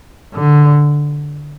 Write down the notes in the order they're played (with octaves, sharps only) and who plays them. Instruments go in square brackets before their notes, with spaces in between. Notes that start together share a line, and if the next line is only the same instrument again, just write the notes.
[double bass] D3